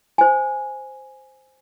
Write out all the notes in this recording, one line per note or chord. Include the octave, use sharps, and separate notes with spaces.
C5 G#5